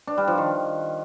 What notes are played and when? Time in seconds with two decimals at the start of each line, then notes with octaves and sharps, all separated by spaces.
0.07 D4
0.18 G3
0.28 F3
0.38 D#3